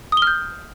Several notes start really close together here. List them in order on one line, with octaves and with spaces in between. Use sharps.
D#6 G7 F6 G6